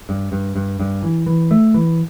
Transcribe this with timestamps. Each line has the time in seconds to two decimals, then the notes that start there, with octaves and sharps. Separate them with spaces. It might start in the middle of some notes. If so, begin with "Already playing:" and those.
0.09 G2
0.32 G2
0.56 G2
0.80 G2
1.03 E3
1.26 E3
1.51 A3
1.74 E3